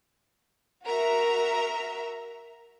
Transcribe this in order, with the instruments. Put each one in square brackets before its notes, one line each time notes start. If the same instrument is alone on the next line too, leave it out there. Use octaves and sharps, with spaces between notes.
[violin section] F#4 A#4 E5 A#5